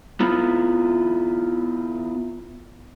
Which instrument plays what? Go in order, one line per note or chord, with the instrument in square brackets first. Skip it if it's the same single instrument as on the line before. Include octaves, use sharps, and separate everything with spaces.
[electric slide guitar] B3 E4 F4